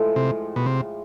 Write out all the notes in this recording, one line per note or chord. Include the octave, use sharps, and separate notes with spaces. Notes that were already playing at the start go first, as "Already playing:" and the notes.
Already playing: A2 F3 G#3
C3
B2
C3